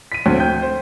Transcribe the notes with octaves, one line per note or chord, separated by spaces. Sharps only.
B6 D#7
D2 A2 C4
G5 G6
C5